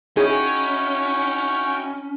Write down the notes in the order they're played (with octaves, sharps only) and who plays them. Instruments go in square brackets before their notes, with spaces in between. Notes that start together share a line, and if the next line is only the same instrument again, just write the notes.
[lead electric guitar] C#4 [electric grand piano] D#4 E4 C#5 [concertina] F#4 G5 [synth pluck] G#4